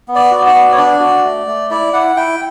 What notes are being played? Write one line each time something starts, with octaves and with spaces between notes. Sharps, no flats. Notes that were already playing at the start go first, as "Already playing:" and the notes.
B3
D5
F#4
D5
B3
C#5
D4 D5
F#4
A3
A3
E4 D5
E4 F#5
E4 G5